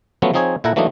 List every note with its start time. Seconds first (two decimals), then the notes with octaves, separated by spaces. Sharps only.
0.22 F3 F#3 A3 B3 C#4
0.34 F3 C4 D#4 G#4 C#5 G#5
0.64 A#2 E4 A4 F#5 A#5
0.76 E3 F#3 A3 A#3 D4 D#4